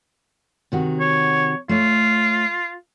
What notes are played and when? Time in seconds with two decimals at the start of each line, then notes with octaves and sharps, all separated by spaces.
0.72 C3 D#3 F#4
1.00 C#5
1.69 A3 F4 C#5